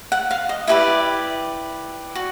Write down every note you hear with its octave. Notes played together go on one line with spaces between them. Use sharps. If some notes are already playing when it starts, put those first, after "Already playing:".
F#5
F5
D#5
E4 G4 B4 D5 E5
F#4